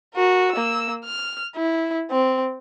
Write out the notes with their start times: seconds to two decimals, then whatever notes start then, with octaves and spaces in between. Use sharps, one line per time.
0.15 F#4 A#4
0.52 A#3 E6
1.05 F6
1.56 E4
2.11 C4